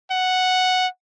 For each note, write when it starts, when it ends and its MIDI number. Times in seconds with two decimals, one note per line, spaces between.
0.11 0.87 78